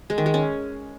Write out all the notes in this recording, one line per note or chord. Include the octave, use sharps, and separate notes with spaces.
G#3
D#3
G#3
C#4